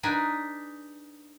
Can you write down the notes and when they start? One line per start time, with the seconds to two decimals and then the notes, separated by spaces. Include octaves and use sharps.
0.03 D4 D#4 G#4 B4